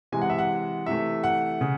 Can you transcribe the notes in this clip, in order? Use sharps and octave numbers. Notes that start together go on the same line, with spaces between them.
C3 E3 G#3 G#5
F#5
E5
F#5
C3 E3 A3 E5
F#5
C#3